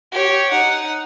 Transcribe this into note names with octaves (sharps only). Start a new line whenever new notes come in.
G4 C#5
D#4 F#5